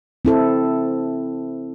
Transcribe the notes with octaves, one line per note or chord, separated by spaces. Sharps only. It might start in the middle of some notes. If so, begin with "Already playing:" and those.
C4 E4 A4